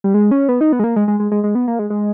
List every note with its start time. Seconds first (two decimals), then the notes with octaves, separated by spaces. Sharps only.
0.04 G3
0.14 G#3
0.31 C#4
0.49 B3
0.61 D#4
0.72 B3
0.79 G#3
0.84 A#3
0.96 G#3
1.08 G#3
1.20 G#3
1.31 G#3
1.44 G#3
1.55 B3
1.68 A#3
1.79 G#3
1.90 G#3